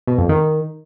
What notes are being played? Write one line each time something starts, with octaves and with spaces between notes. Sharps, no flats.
B2
F2
D#3